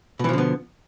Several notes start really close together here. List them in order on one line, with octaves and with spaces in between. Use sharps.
B2 E3 F3 D3 B3